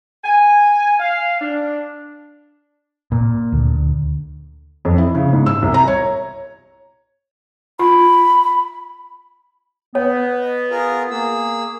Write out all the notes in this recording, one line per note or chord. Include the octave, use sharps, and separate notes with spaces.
G#5
F5
D4
A#2
D2
F2
E4
C#3
G#2
E6
C2
A#5
C#5
F4 B5
B3 C#5
D#5
F4 G#4 A#4
A#3 G#4 E6